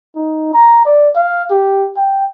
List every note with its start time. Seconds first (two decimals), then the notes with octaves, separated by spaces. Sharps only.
0.16 D#4
0.54 A#5
0.86 D5
1.16 F5
1.51 G4
1.97 G5